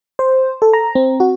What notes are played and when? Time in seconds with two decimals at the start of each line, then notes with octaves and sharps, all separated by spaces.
0.19 C5
0.62 A4
0.73 A#5
0.95 C4
1.20 F#4